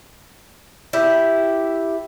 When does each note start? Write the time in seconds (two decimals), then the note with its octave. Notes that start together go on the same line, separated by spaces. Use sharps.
0.93 E4 G4